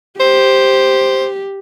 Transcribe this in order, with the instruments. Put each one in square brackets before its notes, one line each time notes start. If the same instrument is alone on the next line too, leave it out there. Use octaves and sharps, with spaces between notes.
[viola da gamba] G4 [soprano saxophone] C5